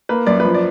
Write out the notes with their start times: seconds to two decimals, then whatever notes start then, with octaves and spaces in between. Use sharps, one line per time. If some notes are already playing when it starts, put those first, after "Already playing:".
0.09 A#3 B4
0.27 F#2 D5
0.40 F3 B4
0.54 D5